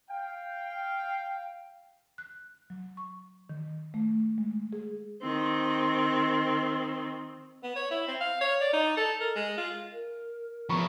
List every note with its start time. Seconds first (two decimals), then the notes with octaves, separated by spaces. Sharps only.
0.11 F5 G5
2.18 F#6
2.70 F#3
2.97 C#6
3.50 D#3
3.94 A3
4.38 G#3
4.73 G#4
5.22 D#3 C4
7.63 B3
7.76 C#5
7.91 E4
8.08 C4
8.20 F5
8.41 C#5
8.61 D5
8.73 D#4
8.97 A4
9.21 A#4
9.35 G#3
9.57 F4
9.93 A#4
10.69 F3 B3 A#5 B5 C#6